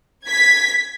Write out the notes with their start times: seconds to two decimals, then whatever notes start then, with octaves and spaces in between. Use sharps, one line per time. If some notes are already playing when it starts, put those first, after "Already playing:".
0.25 G#6 B6